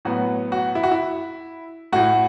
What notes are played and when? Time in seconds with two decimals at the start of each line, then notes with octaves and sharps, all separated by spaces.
0.05 A2 F#3 B3 F#4
0.52 F#4
0.75 E4
0.83 F#4
0.92 E4
1.92 A2 A3 F#4